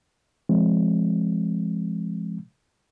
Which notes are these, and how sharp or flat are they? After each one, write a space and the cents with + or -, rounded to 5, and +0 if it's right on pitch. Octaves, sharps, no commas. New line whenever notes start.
F3 -30 G#3 +0 C4 +0